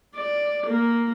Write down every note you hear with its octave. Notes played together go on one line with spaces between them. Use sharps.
D5
A#3